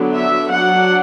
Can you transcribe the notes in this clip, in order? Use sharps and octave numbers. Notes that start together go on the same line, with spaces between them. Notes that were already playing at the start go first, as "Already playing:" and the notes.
Already playing: D3 F#3 B3 D4
E5
F#3 D4 F#5